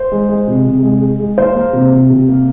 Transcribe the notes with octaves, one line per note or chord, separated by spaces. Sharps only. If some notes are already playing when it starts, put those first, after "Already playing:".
Already playing: C5
G#3
G#3
C3
C3
G#3
G#3
G#3
A#3 C5
A#3
C3
C3
C3
A#3